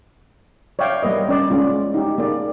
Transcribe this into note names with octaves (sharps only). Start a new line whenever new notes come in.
C#5 D5 E5 F5 G5
G3 A#3 B4 D#5
C#4 D5
G#3 C#4 F4
D#4 G4
A#3 G#4 D5